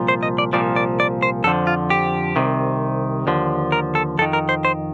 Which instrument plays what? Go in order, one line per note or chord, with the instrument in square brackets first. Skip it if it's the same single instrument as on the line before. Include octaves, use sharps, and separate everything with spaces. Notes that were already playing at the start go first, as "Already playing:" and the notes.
Already playing: [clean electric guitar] C2 A#2 F3
C5
D#5
D5
C2 A#2 F3 D5
D5
D5
C5
F2 D3 F3 A4
F4
G4
C2 C3 D#3
D#2 D3 F3
A#4
A4
F2 A4
D#3
A#4
C5
C5